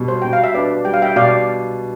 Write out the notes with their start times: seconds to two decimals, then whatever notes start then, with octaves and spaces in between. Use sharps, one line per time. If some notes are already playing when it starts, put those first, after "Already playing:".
Already playing: B2 G3
0.08 C5
0.22 B2 G5
0.33 F5
0.44 E5
0.55 D4 B4 D5
0.85 G3 G5
0.94 F5
1.02 E5 G5
1.16 B2 D5 F5